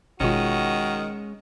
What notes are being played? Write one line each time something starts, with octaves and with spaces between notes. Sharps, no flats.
G#1 B2 D#3 G#3 C#4 F4 F#4